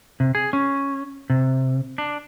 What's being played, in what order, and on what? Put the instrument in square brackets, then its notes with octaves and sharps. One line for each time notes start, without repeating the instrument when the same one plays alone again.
[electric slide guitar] C3
G#4
C#4
C3
D4